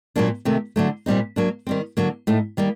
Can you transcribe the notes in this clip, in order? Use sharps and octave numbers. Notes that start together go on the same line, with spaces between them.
A#2 F#3 A#3 D4
C3 D#3 A3
D3 F#3 A3
A#2 G3 C4 D#4
F#3 A#3 D4
D#3 G3 C4
D3 F#3 A#3
A2 A3 D#4
D#3 G3 A#3